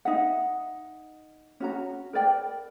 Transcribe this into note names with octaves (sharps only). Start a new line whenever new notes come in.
D#4 E5 F#5
C#4 F#4 A#5
A#4 B4 D5 G5